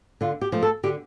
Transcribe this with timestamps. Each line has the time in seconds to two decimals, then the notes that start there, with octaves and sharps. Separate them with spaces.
0.21 D3 F4
0.41 G4
0.52 F3 A3
0.63 A4
0.83 D3 G4